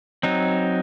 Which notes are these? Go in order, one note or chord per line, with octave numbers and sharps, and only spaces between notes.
F#3 C4 D#4